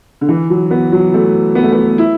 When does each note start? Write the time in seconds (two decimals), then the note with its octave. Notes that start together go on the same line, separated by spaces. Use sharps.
0.21 D3
0.29 E3
0.50 F#3
0.71 B3
0.92 F#3
1.14 A3
1.55 B3
1.64 A3
1.72 B3
1.98 E4